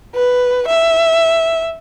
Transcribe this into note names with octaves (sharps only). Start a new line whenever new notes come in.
B4
E5